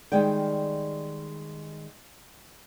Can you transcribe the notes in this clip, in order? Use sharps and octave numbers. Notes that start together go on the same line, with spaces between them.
D#3 G3 G#3 D5 G5